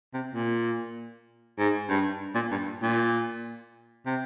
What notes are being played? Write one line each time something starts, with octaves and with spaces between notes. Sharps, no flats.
C3
A#2
G#2
G2
A#2
G2
A#2
C3